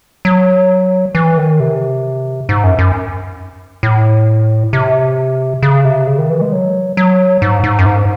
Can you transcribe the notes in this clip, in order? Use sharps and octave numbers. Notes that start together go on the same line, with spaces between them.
F#3
E3
D#3
C3
G#2
F#2
F#2
A2
C3
C#3
C3
C#3
D#3
E3
G#3
F#3
F#3
G#2
G#2
F#2
G#2